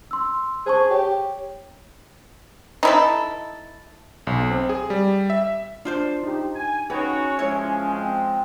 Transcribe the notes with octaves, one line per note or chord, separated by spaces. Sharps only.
C6 E6
G#4 C5 A5 C#6
G4 C#5
D#4 E4 A4
B1
C4
G#4
G3
E5
D4 F4 C5 D5
D#4 G4
G#5
C#4 D#4 F#4 G#4 B4 C#5 G5
F3 G#3 E4 C#5
C4